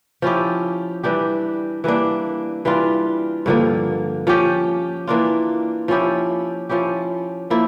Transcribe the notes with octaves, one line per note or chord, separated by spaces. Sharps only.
F3 C#4 E4 G4
E3 G3 D4 G4
E3 G3 A#3 D4
E3 G3 D4 F4
G2 D3 F3 A#3
F3 C#4 G4
E3 A#3 D4 F4
F3 C#4 E4 G4
F3 C#4 E4 G4
F3 A#3 E4